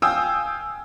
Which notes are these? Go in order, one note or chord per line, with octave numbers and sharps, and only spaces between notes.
F5 G5 G#5 D#6 E6